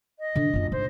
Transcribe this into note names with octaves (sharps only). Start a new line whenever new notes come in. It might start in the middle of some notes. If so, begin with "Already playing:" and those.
D#5
D3
F#1 F4
G#2 C5